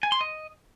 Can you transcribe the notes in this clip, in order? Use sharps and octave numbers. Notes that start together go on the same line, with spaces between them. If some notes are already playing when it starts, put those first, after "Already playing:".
G#5
C6
D#5